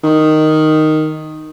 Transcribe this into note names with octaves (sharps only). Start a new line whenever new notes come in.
D#3